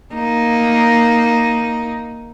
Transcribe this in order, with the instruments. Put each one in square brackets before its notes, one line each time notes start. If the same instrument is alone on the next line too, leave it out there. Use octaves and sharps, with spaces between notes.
[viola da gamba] A#3 D#4